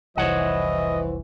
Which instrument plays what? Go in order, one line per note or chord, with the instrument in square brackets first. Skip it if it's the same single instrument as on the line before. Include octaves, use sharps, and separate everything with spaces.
[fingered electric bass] F1 C2 [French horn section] E3 [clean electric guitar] C5 C#5 F#5 [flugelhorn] D#5